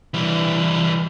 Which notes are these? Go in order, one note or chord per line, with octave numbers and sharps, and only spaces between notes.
E3 G3